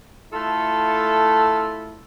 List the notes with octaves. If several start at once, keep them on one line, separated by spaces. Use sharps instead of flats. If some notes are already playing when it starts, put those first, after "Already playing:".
A3 E4 F4 A4